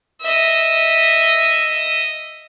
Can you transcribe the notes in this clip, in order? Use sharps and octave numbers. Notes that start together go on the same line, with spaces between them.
D#5 E5